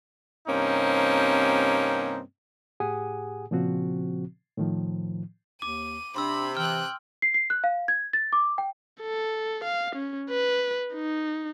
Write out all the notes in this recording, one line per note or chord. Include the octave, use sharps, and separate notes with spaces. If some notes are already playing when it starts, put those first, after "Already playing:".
G2 C3 A#3 C4 C#4 D#4
A2 G4 G#4 F#5 G#5 D#6
A#2 C#3 F3 C4 F#4
A2 D#3 F3
D#2 D6 D#7
C3 D4 B5 C6 E6
E3 G5 F6 F#6
C7
C7
F#6
F5
G#6
A6
D6
G5
A4
F5
C#4
B4
D#4